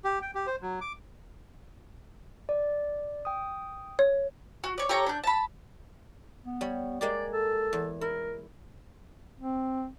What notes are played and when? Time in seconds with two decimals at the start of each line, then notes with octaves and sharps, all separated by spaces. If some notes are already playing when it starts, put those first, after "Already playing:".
0.04 G4
0.22 G5
0.35 G4
0.47 C5
0.62 F#3
0.81 D6
2.49 D5
3.25 G5 D#6
3.99 C#5
4.64 F#4
4.78 C#5 D5
4.89 G4 A4 C#5 A#5
5.07 D4 G6
5.24 A5 B5
6.45 B3
6.61 G3 C#5
7.01 G#3 A#3 G4 D5
7.33 A4
7.73 E2
8.01 E4 A#4
9.40 C4